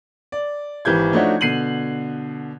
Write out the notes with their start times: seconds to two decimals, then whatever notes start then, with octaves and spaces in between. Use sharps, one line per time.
0.32 D5
0.85 G#1 E3 G4 G6 G#6
1.12 F3 A3 D4 D#4 F#4 C#5
1.41 B2 D3 C7 D#7 F#7